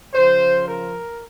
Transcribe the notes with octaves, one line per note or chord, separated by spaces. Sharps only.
C#3 F3 C5
A#4